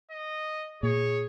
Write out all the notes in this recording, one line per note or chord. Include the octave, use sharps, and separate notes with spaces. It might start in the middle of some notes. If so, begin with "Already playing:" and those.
D#5
A#2 G#4 C#5